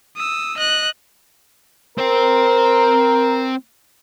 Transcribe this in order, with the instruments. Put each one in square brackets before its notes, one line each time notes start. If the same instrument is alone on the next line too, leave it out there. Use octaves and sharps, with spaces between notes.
[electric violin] D#6 E6
D#5 F#6
[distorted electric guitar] C4 C5 [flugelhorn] A#4